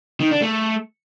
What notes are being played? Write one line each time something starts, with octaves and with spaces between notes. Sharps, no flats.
D#3
D4
A3